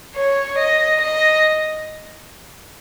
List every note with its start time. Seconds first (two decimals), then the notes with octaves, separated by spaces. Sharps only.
0.15 C#5
0.58 D#5
1.01 D#5